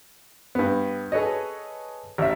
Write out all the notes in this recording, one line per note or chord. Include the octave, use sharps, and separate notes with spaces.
G2 B3
G#4 A4 B4 C#5 D#5
A1 E5